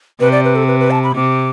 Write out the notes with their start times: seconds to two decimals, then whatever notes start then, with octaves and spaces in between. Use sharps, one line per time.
0.20 C3 B4
0.32 D5
0.44 B4
0.55 A4
0.68 B4
0.80 B4
0.91 A5
1.04 B5
1.14 C3 D6